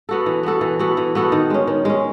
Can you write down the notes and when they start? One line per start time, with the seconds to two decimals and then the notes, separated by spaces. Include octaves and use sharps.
0.09 B3 F#4 A4
0.26 E3
0.43 B3 F#4 A4
0.61 E3
0.79 B3 F#4 A4
0.97 E3
1.15 B3 F#4 A4
1.32 D#3
1.50 G#3 C#4
1.67 D#3
1.85 G#3 C#4